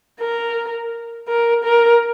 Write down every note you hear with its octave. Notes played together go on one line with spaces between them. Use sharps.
A#4
A#4
A#4